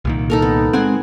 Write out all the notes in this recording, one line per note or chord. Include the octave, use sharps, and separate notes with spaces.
C2 A#2 D#3
D#4 A4 A#4
B3
G#3 B3 C4 F#5 G#5